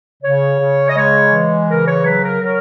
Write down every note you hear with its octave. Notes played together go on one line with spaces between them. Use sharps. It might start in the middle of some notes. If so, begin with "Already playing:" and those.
C#3 C#5
C#3
D#5
G#3 C#5
E3
C#3 A#4
C#5
F#3 B4
A#4
F#3 A#4